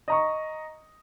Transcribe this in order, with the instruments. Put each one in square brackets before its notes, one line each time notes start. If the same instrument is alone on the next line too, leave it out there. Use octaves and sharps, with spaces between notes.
[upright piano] D#5 A#5 C#6